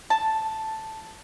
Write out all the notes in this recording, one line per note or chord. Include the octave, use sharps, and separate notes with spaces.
A5